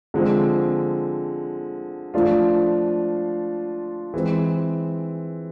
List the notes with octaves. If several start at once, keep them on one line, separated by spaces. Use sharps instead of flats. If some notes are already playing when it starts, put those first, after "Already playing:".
D3 F3 G#3 C4
F3 A3 D4 F4
E3 G#3 C4